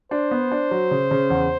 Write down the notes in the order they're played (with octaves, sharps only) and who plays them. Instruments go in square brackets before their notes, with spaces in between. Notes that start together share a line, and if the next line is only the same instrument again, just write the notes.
[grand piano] D4 [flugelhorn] C5
[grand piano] B3
D4
F#3
C#3
C#3
E2